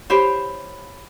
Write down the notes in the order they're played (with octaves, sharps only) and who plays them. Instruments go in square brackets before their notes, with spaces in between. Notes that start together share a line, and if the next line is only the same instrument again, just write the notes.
[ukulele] E4 G4 C5 C#5